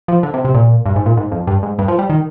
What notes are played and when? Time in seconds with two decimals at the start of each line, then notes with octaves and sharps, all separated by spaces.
0.08 F3
0.23 D3
0.34 C3
0.45 C3
0.54 A#2
0.86 G2
0.96 G#2
1.06 A#2
1.17 G#2
1.32 F2
1.47 G2
1.63 G#2
1.79 G2
1.88 F3
1.99 G3
2.10 D#3